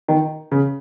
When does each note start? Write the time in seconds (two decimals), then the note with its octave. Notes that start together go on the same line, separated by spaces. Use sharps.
0.08 D#3
0.51 C#3